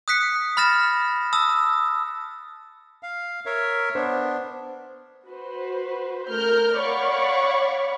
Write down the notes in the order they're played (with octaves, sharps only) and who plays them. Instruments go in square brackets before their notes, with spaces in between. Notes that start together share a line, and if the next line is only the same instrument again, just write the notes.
[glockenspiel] D#6 F#6 B6 C#7
B5 F6 A6 A#6 E7
A5 D#6 E6
[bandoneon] F5
A#4 C#5 E5
[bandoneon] B3 D4 [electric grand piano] C5
[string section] F#4 B4 C5
A3 A#4 F6 G6
C#5 D5 F5 F#5 B5 C#6